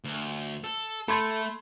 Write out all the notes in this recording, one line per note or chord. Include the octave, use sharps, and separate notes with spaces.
D2
A4
A3 A4 B5 C6 G#6